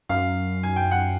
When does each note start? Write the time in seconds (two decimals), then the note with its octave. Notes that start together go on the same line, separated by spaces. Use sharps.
0.09 F#2 F5
0.63 G#5
0.76 G5
0.91 F#5